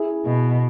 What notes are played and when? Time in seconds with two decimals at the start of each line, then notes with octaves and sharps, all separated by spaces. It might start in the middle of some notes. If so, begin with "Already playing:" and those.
Already playing: E4 G#4
0.26 B2